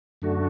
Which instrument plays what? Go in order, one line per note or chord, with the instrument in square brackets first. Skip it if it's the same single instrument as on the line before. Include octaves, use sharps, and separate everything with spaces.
[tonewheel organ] F#2 D3 A3 D4 F#4